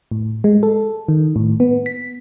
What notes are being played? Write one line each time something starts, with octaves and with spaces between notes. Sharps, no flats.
A2
G#3
A4
D#3
A2
B3
B6